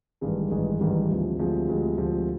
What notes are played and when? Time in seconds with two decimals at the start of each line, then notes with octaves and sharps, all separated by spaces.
0.21 A1 G2 D#3 G#3
0.51 A1 G2 D#3 G#3
0.80 A1 G2 D#3 G#3
1.10 D2 C3 F3 G#3
1.39 D2 C3 F3 G#3
1.68 D2 C3 F3 G#3
1.98 D2 C3 F3 G#3